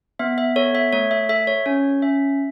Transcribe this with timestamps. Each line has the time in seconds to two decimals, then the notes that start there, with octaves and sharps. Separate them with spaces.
0.19 B3 E5
0.38 E5
0.56 A4 C#5
0.75 E5
0.93 A3 C#5
1.11 E5
1.29 A4 E5
1.47 C#5
1.66 C#4 C#5
2.02 C#4 E5